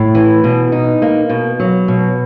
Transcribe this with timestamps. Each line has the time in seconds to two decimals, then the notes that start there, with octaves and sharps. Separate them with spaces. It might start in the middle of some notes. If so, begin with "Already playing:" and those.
Already playing: A2
0.15 E3
0.44 B2
0.72 D#4
1.02 A#3
1.30 B2
1.60 F#3
1.88 B2